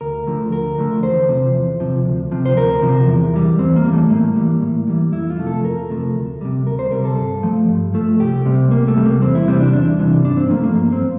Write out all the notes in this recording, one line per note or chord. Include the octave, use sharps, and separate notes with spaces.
D2 A#4
D3 F3 A3
D2 A#4
D3 F3 A3
E2 C5
C3 F3
E2
C3 F3
D2
C3 F3
C5
D2 A#4
C3 F3
E2
E3 G3
E2 C4
A#3
E3 G3
A3
A2 A#3
E3 G3
A2
E3 G3
F2 E4
F4
C3 F3 A3
A4
F2 A#4
C3 F3 A3
D2
C3 G3
D2 A#4
C5
C3 G3 A#4
A4
G2
F3 A3
G2
F3 A3
C2 G4
C3 G3
C2 A#3
A3
C3 G3
A#3
E2 C4
E4
C3 E3 G3 C4
D4
E2 D4
C3 E3 G3
G2 D4
C4
F3 A3 A#3
A#3
G2 A#3
C4
F3